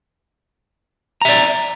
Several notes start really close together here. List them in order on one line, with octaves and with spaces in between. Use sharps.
A#5 E5 D5